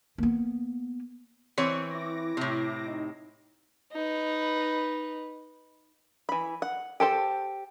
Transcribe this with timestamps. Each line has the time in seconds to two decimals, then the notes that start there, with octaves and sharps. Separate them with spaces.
0.18 A#3 B3
1.58 E3 C4 C#5
1.90 E4 D6 A#6
2.37 A2 C3
2.86 D#4
3.92 D#4 B4
6.29 E3 B5
6.62 F#5
7.00 G4 A4 C5 A5